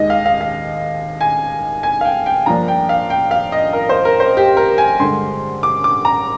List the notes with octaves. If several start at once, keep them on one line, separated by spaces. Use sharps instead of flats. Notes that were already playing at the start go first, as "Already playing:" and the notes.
Already playing: D#2 D#3 G#3 D#5
F5
F5
F5
G#5
G#5
F5
G5
G5
G2 F3 A#3 D4 A#5
G5
F5
G5
F5
D#5
A#4
C5
A#4
C5
G4
A#4
G#5
G2 D3 G#3 C6
D6
D6
A#5